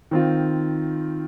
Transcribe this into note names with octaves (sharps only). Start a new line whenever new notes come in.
D#3 C4 F4